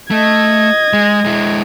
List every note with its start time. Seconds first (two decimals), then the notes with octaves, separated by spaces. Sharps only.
0.11 A3 D#5 G#6
0.93 G#3
1.25 G#3 E4